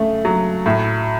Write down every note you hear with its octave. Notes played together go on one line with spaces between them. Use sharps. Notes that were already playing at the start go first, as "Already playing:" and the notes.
Already playing: C#3 A3
F#3
A2